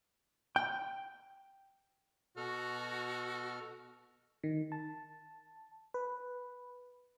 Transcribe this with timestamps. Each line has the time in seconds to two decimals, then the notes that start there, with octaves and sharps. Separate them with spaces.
0.56 G5
2.37 B2 F#4 A4 F6
4.44 D#3
4.72 A5
5.94 B4